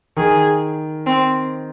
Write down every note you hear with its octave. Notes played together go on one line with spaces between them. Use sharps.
D#3 G#4
C4